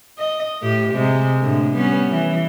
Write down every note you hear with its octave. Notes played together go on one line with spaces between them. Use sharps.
D#5
A2 G4
C3 G#3
A2 D3
G3 B3 C#4
E3